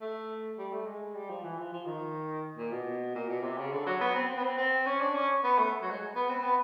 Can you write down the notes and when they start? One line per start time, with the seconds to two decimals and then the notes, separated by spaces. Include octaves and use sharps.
0.01 A3
0.58 G3
0.72 A3
0.86 G#3
1.15 G3
1.29 F3
1.44 E3
1.58 F3
1.73 F3
1.86 D#3
2.57 A#2
2.72 B2
3.15 A#2
3.30 B2
3.43 C3
3.58 C#3
3.72 D3
3.86 F#3
4.01 B3
4.15 C4
4.29 C4
4.38 B3
4.44 C4
4.58 C4
4.86 C#4
5.00 D4
5.14 C#4
5.44 B3
5.58 A3
5.82 F#3
5.91 G#3
6.15 B3
6.29 C4
6.43 B3